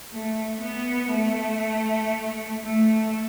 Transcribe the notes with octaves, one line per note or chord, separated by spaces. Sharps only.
A3
B3
A3
A3